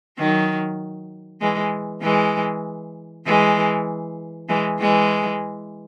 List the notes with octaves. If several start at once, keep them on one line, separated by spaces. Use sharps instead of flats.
D#3 F#3
E3 G#3
E3 G#3
E3 G#3
E3 G#3
E3 G#3